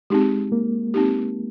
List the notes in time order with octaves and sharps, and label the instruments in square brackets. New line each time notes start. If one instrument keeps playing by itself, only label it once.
[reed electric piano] G#3 [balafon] C4 D#4 G4
[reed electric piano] A#3
[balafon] C4 D#4 G4